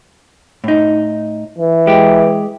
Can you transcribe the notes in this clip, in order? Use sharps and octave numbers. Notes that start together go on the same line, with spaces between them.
A2 D#4
E3
G#3 G4